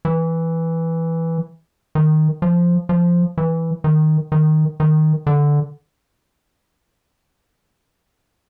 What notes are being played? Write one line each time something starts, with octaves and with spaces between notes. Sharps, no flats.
E3
D#3
F3
F3
E3
D#3
D#3
D#3
D3